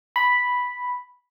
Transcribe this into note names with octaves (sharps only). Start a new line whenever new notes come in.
B5